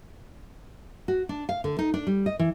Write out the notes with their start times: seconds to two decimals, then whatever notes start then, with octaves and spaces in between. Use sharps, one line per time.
1.08 F#4
1.29 D4
1.49 F5
1.64 D3
1.79 D#4
1.94 D4
2.07 G3
2.26 D#5
2.39 E3